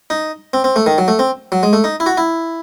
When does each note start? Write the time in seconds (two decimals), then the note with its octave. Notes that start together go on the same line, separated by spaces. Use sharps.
0.10 D#4
0.53 C4
0.64 C4
0.76 A3
0.86 D#3
0.98 F#3
1.08 A3
1.19 C4
1.52 F#3
1.63 G#3
1.73 A3
1.84 D#4
2.00 E4
2.06 F#4
2.17 E4